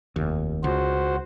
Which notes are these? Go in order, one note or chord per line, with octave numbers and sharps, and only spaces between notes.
F1 D#2
C#2 F#4 C5